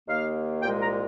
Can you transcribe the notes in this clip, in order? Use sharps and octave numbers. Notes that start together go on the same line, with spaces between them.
D#2 D#3 A#3 F5
C2 A#2 G#3 G5
A#5